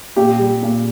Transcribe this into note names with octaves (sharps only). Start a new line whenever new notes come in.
A#2 G4
G3
A#2